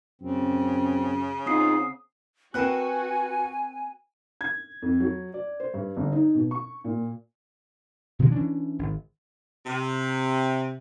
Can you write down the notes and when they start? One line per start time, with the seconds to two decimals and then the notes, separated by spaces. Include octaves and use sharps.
0.22 F#2 C#3 C4
1.46 C4 D#4 F4 G#4 D#6 C7
2.54 C4 F#4 A#4 B4 F#5 G#5 A5 F#6
4.41 G#6
4.82 F2
5.00 F#3
5.34 D5
5.60 C5
5.74 G2
5.97 G1
6.12 D#4
6.35 B2
6.51 C#6
6.84 A#2
8.19 B2 D#3 F3 G#3
8.32 E3 C#4 D4
8.79 G#1
9.66 C3